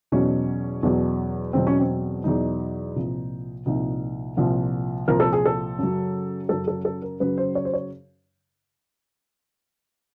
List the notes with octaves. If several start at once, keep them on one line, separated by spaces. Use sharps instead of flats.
E2 B2 F#3 C#4
E2 B2 F#3
E2 B2 F#3 C4
C#4
C4
E2 B2 F#3 D#4
C2 A#2 F3
C2 A#2 F3 D#4
C2 A#2 F3
C2 A#2 F3 A#4
A4
G#4
A4
F#2 C#3 F#3
F#2 C#3 F#3 A4
A4
A4
A#4
F#2 C#3 F#3 B4
C5
C#5
C5
C#5